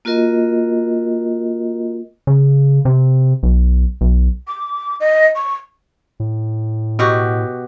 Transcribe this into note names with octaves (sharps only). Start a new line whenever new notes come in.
A#3 F4 F#4 A#4 D#5
C#3
C3
B1
B1
D6
D#5
C#6
A2
B2 F#4 G4